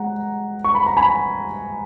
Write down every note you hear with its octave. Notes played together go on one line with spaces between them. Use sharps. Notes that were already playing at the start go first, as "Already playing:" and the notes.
Already playing: G#3 F#5 A#5
C#6
B5
A#5
G#5 B5